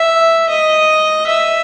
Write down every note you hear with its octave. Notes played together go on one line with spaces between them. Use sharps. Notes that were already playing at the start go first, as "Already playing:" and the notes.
Already playing: E5
D#5
E5